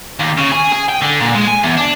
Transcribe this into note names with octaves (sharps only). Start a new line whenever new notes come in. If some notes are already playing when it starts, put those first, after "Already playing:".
D#2
C#3
G#4
G#4
G5
D3
A#2
G#3
G#5
E2
D4